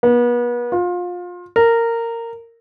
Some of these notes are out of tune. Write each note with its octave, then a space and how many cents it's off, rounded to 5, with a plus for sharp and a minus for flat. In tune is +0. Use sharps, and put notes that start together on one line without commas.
B3 -35
F4 +25
A#4 -15